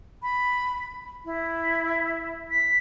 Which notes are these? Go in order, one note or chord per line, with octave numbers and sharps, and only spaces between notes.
B5
E4
B6